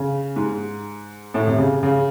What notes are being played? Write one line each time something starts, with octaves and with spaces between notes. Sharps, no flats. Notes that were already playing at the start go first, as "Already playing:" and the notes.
Already playing: C#3
G#2
A2
C3
C#3
C#3